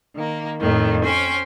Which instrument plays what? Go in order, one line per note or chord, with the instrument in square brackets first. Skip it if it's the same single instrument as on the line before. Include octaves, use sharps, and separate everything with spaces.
[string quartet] D#3 A#3
F2 A2 D#3
C#4 C5 G5